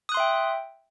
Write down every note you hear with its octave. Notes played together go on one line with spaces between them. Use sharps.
E5 G5 C6 D#6 F#6